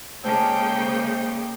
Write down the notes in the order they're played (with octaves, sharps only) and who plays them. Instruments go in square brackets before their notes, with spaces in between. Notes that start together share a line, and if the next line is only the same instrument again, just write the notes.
[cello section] C#3 G#3 A#3 [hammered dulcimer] A4 A#4 D5 [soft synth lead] C5 [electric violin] G5